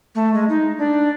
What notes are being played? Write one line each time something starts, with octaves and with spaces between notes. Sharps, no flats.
A3
G#3
D#4
D4